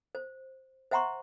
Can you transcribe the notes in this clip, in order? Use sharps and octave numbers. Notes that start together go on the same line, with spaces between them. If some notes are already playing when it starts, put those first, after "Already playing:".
C5
C5 E5 F#5 A#5 C6 C#6